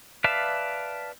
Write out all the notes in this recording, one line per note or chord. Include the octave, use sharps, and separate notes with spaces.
B4 D5 E5 F5 A5